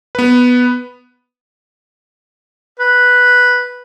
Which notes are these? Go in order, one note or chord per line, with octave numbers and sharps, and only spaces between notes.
B3 B4
B4